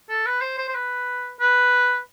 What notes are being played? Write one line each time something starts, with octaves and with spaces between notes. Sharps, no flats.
A4
B4
C5
C5
C5
B4
B4